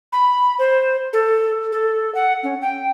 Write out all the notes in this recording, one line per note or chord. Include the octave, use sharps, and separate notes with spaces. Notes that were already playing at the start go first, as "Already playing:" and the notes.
B5
C5
A4
A4
F#5
C#4
G5